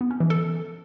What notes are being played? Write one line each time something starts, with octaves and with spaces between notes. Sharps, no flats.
B3
C#4
E3
A4